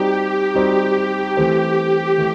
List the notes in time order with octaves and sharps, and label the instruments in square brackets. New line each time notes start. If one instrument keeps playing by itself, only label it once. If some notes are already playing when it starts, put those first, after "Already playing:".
Already playing: [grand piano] G3 C4 D#4 F#4 [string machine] G4
[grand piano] G3 C4 D#4 F#4
E3 A3 C4
E3 A3